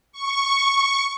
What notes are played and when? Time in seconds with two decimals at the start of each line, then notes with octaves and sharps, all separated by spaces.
0.12 C#6